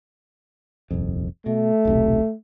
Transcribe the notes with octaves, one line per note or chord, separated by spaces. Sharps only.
D#1 C2 F2
B2 A3
D#1 B1 C3